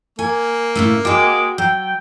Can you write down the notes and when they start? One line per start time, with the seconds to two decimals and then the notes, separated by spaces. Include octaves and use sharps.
0.19 A#3 G#5
0.76 A2 C#3 A3
1.05 G#3 F#4 G5 D6
1.58 F#3 G5